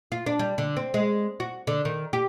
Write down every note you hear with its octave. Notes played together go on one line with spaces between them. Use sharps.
F4
D4
G3
D3
C4
G#3
F#4
D3
D#3
G4